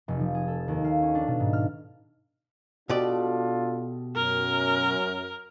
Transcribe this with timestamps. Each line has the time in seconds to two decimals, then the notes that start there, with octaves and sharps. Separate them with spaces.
0.08 F1
0.20 F3
0.35 G#4
0.48 A4
0.68 D#2
0.84 F5
1.02 C#4
1.15 D4
1.27 B2
1.40 G#2
1.53 F6
2.89 B2 D4 F4 G4 A4 D5
4.16 F#2 A#4